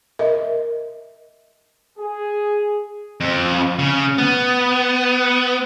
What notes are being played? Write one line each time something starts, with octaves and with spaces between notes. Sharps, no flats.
A#4 D#5 E5
G#4
F2
C#3
B3